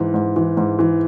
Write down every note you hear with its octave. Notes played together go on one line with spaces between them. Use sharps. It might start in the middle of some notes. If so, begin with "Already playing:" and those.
Already playing: G#2 E3
G#2
E3
G#2
E3